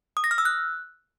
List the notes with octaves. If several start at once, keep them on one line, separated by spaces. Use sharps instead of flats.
D#6
A#6
F6
E6
F#6